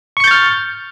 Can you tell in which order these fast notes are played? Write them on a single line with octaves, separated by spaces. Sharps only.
C#6 C#7 G6 A6 F6